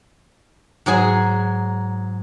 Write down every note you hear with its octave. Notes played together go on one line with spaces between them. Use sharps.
G#2 F#3 G#4 G#5